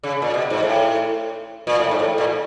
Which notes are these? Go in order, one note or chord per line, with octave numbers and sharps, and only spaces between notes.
C#3
A#2
B2
G#2
A2
A#2
A2
G#2
A2
A#2